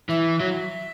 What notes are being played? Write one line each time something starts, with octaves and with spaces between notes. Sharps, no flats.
E3 E5
F#3